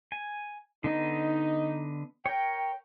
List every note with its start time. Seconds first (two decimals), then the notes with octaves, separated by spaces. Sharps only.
0.12 G#5
0.84 D3 B3 D#4 D#5
2.26 A#4 C#5 G5